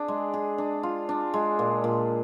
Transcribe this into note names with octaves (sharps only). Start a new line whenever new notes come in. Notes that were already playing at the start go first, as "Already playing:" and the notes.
Already playing: D4 G#4
G#3
G#4
D4
F4
D4
G#3
A#2
A#2